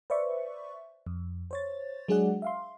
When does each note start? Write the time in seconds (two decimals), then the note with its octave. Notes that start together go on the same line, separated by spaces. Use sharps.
0.10 B4 C5 D5 E5 C#6
1.07 F2
1.51 C5 C#5 A6
2.08 F#3 G#3 D4 G#4 D5 F#5
2.42 E5 F5 C6